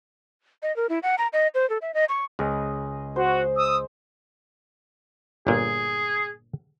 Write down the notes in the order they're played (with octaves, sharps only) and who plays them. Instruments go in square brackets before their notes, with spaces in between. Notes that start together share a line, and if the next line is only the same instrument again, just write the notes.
[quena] D#5
A#4
E4
F#5
A#5
D#5
C5
A4
E5
D#5
C#6
[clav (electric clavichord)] C#2 [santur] G#4 D#5
[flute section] F#4 [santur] C5
[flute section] D#6 E6
[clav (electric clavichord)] G1 A#2 [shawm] G#4